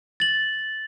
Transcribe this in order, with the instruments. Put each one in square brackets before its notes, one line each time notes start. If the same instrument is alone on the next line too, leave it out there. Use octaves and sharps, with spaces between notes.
[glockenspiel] A6 F#7